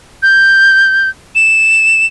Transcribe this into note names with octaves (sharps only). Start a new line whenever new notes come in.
G6
E7